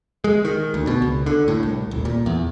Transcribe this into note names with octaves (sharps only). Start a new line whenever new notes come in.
G#3
D#3
D2
B2
C#2
D3
A2
C2
D#1
A#2
E2